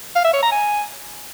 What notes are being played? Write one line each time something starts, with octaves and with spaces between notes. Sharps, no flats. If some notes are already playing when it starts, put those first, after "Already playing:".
F5
E5
C#5
A#5
G#5